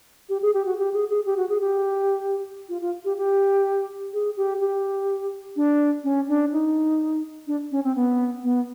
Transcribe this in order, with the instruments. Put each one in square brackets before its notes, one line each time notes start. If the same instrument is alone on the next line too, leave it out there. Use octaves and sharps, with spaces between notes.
[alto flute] G4
G#4
G4
F#4
G4
G#4
G#4
G4
F#4
G#4
G4
F4
F4
G4
G4
G#4
G4
G4
D4
C#4
D4
D#4
D4
C#4
C4
B3
B3